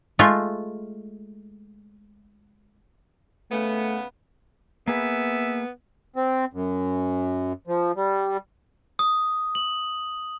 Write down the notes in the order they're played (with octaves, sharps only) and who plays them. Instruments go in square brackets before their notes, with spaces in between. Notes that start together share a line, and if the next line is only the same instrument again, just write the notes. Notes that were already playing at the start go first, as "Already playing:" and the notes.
[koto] G#3 A3 F4
[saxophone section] C#3 B3 [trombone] A3
[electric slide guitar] A#3 G#4 B4 [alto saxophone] B3 [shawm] E5
[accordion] C4
F#2
F3
G3
[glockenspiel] D#6
F#7